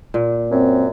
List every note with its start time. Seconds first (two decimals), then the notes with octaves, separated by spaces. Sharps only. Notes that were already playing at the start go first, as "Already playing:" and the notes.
0.14 A#2
0.51 F#2 C4